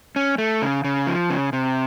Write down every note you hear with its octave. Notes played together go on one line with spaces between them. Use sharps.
C#4
A3
C#3
C#3
F3
C#3
C3